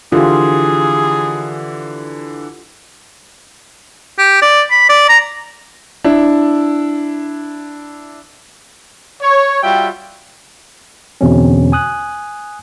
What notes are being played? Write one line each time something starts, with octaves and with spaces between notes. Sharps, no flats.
D3 E3 F4 G4 G#4
G4
D5
B5
D5
A#5
D4 E4
C#5
G3 F4 F#4 E5 G5
E2 B2 D3 C4 C#4
G#5 D#6 F#6